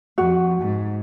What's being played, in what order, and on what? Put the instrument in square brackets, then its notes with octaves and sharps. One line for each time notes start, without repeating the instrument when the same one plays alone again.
[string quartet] F2 [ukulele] F#4
[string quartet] G#2